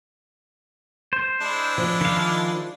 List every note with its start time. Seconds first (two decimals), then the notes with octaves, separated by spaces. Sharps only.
1.13 C5
1.41 G#3 D4 E4
1.78 F3
2.01 D#3 F5